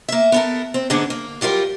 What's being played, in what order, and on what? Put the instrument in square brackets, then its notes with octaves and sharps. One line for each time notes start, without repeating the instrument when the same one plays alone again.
[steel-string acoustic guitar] A#3 E5
B3 A4 A#4
C4
G#2 D3 A#3 B3 D4 G#4
A#3
F#3 G3 F4 F#4 A#4